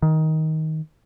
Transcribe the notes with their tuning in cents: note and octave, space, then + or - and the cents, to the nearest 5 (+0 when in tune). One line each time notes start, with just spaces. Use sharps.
D#3 +15